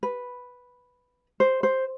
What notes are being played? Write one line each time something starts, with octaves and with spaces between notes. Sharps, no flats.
B4
C5
C5